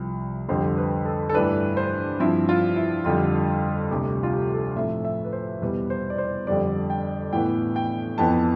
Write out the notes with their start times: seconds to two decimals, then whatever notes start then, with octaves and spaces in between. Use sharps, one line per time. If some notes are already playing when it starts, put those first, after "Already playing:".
Already playing: C2 C3 F3
0.48 F2 D3 G3 C5
0.78 B4
1.05 A4
1.29 A4
1.34 G2 E3 A3 D4 B4
1.77 C5
2.19 G2 F3 C4 E4
2.49 F4
2.76 E4
3.05 F2 D3 G3 F4
3.91 D2 C3 G3 G4
4.23 F4
4.33 G4
4.54 A4
4.76 A2 F3 A3 C4 E5
5.05 E5
5.25 B4
5.33 C5
5.61 E2 B2 G3 B4
5.90 C5
6.10 D5
6.18 C5
6.47 F2 D3 G3 D4 D5
6.90 G5
7.33 A2 E3 B3 G5
7.76 G5
8.18 F2 E3 B3 A5